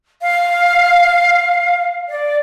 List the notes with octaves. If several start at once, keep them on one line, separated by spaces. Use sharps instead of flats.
F5
D5